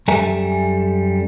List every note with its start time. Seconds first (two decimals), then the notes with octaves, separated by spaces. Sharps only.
0.08 F#2 G3 A4 E5 G#5 A#5